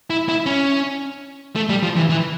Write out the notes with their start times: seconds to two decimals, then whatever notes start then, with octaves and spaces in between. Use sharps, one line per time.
0.10 E4
0.29 E4
0.46 C#4
1.56 A3
1.69 G3
1.83 F3
1.96 E3
2.10 E3